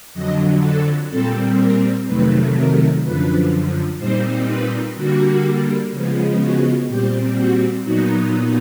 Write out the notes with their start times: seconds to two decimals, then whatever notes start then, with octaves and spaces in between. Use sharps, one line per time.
0.14 F2 D3 F#3 D#5
0.63 A4
1.10 A#2 G3 C4 A4
1.59 A#4
2.07 F2 C3 D#3 F#3 A3 B4
2.55 A#4
3.03 F#2 D3 F3 B4
3.99 A#2 G3 C4 D#4 C5
4.48 B4
4.95 D3 G3 A#3 F#4
5.91 C#3 F3 G#3 B3
6.39 F#4
6.88 A#2 G3 C4 G4
7.37 F#4
7.84 A#2 F#3 B3 D#4 F#4